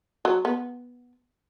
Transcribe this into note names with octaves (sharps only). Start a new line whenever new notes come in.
F#3
B3